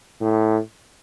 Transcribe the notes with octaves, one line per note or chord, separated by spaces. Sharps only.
A2